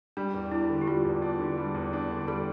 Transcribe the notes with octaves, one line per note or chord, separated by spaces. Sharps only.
G3 D4
E2
D4 E4
D3
G4
G3 F4
E2
D4
D3
G3
E2
D4
D3
G3 A4